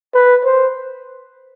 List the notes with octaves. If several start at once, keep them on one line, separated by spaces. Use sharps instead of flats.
B4
C5